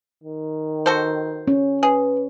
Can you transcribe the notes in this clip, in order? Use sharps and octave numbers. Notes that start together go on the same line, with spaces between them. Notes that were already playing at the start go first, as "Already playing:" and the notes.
D#3
F#4 A4 C5
C#4
G#4 B4